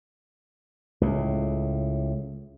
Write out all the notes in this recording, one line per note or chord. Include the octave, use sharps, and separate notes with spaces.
C#2 A2